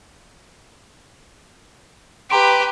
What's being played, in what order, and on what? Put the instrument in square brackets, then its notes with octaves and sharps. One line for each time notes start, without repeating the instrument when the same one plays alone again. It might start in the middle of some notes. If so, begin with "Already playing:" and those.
[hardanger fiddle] G4 B4 [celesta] A#5 C6 D7